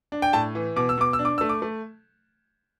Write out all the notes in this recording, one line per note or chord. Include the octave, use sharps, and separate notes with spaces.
D4
G5
A2 A5
E3
B2 D6
E6
B2 D6
E6
D4
D6
A3 E6
D6
A3